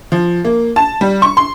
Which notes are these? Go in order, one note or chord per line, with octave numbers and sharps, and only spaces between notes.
F3
A#3
A5
G3
C#6
C6